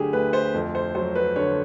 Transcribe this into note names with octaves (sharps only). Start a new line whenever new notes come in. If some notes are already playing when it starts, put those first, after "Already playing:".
Already playing: D2 D3 F#3 G4 G#4
D2 B4
C5
F2
C5
F#3 C5
B4
D3 C#5